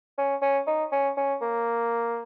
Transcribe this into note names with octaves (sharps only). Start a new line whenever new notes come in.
C#4
C#4
D#4
C#4
C#4
A#3